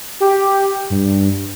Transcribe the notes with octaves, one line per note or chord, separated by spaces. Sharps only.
G4
G2